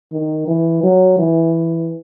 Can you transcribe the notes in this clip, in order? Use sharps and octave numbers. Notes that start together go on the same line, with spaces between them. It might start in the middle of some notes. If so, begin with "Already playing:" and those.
D#3
E3
F#3
E3